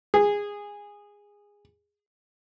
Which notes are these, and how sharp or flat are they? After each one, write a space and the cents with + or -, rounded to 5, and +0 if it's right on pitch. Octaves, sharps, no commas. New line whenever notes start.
G#4 -15